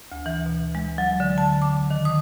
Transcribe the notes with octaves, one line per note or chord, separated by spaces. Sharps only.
D2
E3
B2
G#3
F#3
D3
A5
D6
D#3
D#6